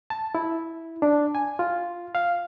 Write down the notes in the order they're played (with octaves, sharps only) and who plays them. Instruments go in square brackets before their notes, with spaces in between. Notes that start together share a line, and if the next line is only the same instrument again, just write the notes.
[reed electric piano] A5
E4
D4
G#5
F4
F5